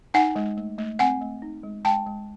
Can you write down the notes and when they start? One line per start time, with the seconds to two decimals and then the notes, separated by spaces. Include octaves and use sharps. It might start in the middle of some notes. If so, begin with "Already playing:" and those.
0.14 D#4 F#5 G#5
0.36 G#3
0.57 A3
0.78 A3
0.99 C4 F#5 G#5
1.21 A3
1.42 D#4
1.63 G#3
1.85 G#3 G5 A5
2.06 G#3